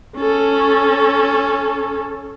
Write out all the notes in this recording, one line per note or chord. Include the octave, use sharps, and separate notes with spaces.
C#4 A4